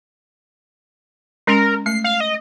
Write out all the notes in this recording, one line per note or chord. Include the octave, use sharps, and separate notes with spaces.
G#3 C#4 A#4 C6
A3 C7
F5
D#5